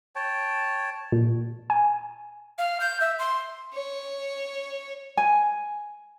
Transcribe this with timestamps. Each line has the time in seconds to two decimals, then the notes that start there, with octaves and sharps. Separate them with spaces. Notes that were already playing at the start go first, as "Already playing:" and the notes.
0.16 C#5 G5 A5
1.12 A#2
1.70 G#5
2.58 F5
2.80 G6
3.00 E5
3.19 C6
3.73 C#5
5.17 G#5